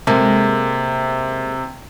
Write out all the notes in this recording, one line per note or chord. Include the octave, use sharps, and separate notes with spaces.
C3 G#3 A#3 A4